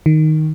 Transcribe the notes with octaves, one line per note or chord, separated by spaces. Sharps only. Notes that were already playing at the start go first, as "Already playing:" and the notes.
D#3